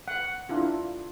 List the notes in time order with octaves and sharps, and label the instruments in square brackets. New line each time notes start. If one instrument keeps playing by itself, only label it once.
[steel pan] F#5
D4 E4 F4